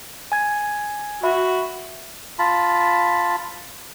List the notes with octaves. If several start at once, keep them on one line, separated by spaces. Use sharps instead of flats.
G#5 G#6
F#4 E5 B5
F4 A5 B5